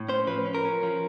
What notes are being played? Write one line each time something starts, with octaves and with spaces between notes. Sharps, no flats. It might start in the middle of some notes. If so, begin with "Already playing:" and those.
Already playing: A2
C#4 C5
F3 B4
C#4
A#4
C#4
F3